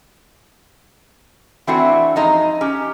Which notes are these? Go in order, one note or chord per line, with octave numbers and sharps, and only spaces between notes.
E3 A3 C4 D4 E4 F#4
F2 G#3 D#4 D#5 A#5
C#4 G4